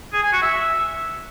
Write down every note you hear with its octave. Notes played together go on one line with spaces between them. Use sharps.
G#4
G#5
F#4
E5